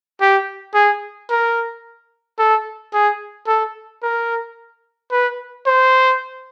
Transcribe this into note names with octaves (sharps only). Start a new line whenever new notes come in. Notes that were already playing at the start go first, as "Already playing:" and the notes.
G4
G#4
A#4
A4
G#4
A4
A#4
B4
C5